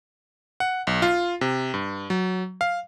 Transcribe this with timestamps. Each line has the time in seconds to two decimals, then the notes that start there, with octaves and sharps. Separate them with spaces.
0.60 F#5
0.87 B1
1.02 F4
1.41 C3
1.74 G2
2.10 F#3
2.61 F5